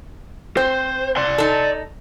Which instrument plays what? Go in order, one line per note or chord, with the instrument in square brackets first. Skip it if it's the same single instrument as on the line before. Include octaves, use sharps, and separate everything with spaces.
[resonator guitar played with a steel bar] C4 [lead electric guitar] C5
[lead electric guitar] D5 C6
[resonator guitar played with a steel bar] D#4 A4